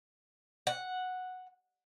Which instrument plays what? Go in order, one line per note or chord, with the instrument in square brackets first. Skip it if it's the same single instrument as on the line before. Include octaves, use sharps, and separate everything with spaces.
[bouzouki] F#5